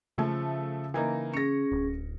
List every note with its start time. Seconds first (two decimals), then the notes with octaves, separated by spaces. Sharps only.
0.18 C#3 F3 A3
0.94 E3 A#3 D#4
1.34 C#4 G#4 A#6 C#7
1.72 D1